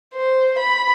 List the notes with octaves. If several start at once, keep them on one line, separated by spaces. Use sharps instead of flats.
C5
B5